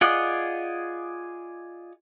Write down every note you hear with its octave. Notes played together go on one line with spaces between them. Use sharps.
F4 G#4 D5 D#5 F#5